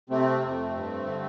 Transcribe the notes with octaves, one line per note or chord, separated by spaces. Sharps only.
C3 A3 C4
F2
G2
D3